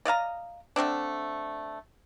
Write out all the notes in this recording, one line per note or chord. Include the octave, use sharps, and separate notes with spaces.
D5 D#5 F5 A#5
D3 A3 C4 D4